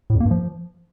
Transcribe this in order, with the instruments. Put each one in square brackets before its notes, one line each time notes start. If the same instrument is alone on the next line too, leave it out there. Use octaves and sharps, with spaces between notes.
[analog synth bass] A2
F2
A#3
G2
F3